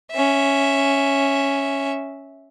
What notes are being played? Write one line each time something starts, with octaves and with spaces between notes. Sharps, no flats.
C#4 E5